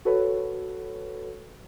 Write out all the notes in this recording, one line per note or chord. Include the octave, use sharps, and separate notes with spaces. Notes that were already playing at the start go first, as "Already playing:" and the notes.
F#4 A4 B4 C#5